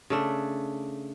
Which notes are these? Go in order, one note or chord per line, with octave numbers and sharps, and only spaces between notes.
C#3 A3 D4